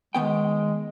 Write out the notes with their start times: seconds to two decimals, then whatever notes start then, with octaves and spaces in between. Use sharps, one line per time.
0.15 D#3 G#3 B3 G5